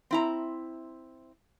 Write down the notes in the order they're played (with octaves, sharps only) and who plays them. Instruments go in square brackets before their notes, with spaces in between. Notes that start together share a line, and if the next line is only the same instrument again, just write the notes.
[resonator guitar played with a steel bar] C4 E4 A#5